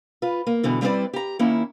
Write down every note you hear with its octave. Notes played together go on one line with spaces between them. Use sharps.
F4 B4
A#3
G2 B2 D3 E3
G3 C4 E4 B4 C5 D5
G4 A#5
D#3 A#3 C#4 E4